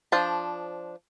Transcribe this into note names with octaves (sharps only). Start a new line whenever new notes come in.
F3 D4 C5 A5